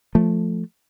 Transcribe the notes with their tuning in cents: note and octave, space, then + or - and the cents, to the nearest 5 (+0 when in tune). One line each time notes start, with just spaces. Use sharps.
F3 +0 A3 +0